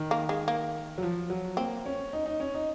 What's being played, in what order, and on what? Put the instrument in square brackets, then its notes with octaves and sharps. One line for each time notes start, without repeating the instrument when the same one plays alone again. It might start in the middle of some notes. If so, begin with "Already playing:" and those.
Already playing: [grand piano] D#3
[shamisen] A#3
G#3
A#3
[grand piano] F#3
F3
F#3
[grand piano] A#3 [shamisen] C4
[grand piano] C#4
D#4
D#4
C#4
D#4